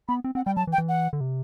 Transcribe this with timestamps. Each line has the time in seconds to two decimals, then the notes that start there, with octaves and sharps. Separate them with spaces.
0.08 B3 B5
0.24 C4
0.35 C4 F#5
0.46 G3 G5
0.57 F#3 A5
0.67 E3
0.73 G5
0.78 E3
0.89 F#5
1.13 D3
1.21 C3